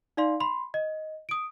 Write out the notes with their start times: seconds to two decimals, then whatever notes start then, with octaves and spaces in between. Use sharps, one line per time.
0.17 D#4 D5 F5 C6
0.40 B5 C6
0.74 D#5
1.29 D#6 D7